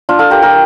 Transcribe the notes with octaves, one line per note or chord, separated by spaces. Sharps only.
D4 F4
F4 A4
G4 A#4
G4 A#4